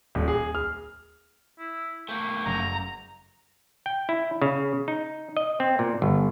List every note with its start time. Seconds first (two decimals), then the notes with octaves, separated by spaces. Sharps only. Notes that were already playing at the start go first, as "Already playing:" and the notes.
0.15 D#1
0.28 G#4
0.55 F6
1.59 E4
2.09 A3 A#3 G5
2.46 F#1 A#5 A#6
3.86 G5
4.09 E4
4.42 C#3
4.88 D#4
5.37 D#5
5.60 C4
5.79 A#2
6.02 G1